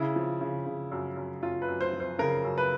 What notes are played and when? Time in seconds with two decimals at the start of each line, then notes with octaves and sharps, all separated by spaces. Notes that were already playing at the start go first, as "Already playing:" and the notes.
Already playing: C#3 E4
0.16 F3
0.41 C#3
0.66 C#3
0.92 F#2
1.17 F#2
1.42 F#2 F4
1.62 B4
1.68 F#2
1.81 C5
1.93 F3
2.00 C5
2.19 C#3 A#4
2.45 F#2
2.58 B4